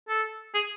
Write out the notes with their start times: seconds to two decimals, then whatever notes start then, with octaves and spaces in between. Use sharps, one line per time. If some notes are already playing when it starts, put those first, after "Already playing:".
0.08 A4
0.54 G#4